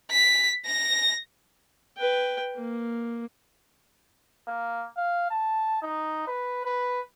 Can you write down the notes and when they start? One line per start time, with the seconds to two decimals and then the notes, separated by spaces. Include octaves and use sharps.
0.11 B6
0.66 A#6
1.97 B4 G5
2.56 A#3
4.48 A#3
4.97 F5
5.31 A5
5.82 D#4
6.27 B4
6.65 B4